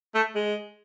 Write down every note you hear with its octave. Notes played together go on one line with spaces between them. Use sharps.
A3
G#3